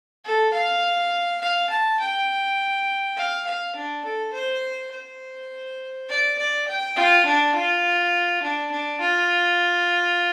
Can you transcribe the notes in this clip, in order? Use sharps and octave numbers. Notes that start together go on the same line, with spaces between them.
A4
F5
F5
A5
G5
F5
F5
D4
A4
C5
C5
D5
D5
G5
F4
D4
F4
D4
D4
F4